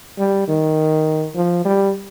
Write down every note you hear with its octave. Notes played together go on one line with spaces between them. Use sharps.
G3
D#3
F3
G3